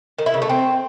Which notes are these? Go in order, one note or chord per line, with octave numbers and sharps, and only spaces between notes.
D#3
E4
C#3
A3
C4